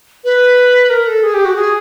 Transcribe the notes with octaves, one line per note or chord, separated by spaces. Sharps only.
B4
A#4
A4
G#4
G4
F#4
G#4